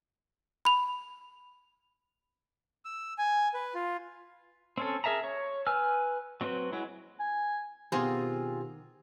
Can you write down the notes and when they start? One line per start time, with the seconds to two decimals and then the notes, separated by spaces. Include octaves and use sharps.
0.65 B5 F7
2.85 E6
3.18 G#5
3.54 B4
3.75 F4
4.78 C4 C#4 A4
5.04 G#4 A#4 E5 A5 A#5
5.24 C#5
5.67 B4 G#5 E6 F6
6.41 F#3 C4 F#4 B4
6.72 F#3 G#3 E4
7.20 G#5
7.92 B2 D#3 B3 C4 F4 G4 G#4 C6